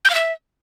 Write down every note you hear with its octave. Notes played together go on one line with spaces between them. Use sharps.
G6
F5
E5